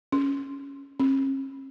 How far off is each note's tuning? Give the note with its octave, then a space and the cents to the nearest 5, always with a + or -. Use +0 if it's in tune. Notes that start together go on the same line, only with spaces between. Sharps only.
C#4 +0
C#4 -45